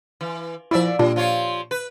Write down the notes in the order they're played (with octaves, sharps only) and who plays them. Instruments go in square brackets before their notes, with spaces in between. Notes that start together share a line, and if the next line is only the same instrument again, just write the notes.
[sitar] E3
[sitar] A#2 D5 E5 [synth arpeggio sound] F3 E4
[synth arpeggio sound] A#2 D4 [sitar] G3
[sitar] F3 F4 C#5
B4